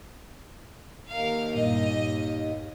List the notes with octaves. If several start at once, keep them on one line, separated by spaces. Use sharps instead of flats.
D#2 A#4 F5
G2 A#2 D#5